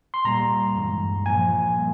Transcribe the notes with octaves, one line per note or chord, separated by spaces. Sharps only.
C6
A#2 G3 A#3 A#5
G2 E3 G#3
A#2 F3 A#3 G#5
G3 A#3